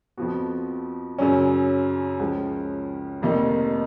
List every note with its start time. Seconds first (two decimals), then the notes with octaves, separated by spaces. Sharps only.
0.17 F2 F3 B3 F#4
1.18 F#2 C#3 F#3 C#4
2.20 C#2 C#3 F3
3.22 F1 F2 D#3 A#3 D#4